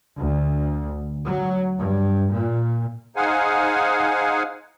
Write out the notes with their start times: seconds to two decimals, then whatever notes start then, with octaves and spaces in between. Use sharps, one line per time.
0.16 D2
1.24 F#3
1.77 G2
2.31 A#2
3.16 D#4 G#4 C5 F5 F#5 G#5